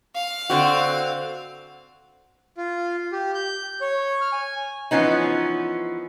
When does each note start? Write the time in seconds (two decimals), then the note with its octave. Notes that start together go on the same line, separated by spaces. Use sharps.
0.15 F5
0.50 D3 C4 F#4
2.57 F4
3.12 G4
3.35 G6
3.81 C#5
4.21 F6
4.32 G#5
4.91 E3 F3 B3 C#4 D#4